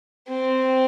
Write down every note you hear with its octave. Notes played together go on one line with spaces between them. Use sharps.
C4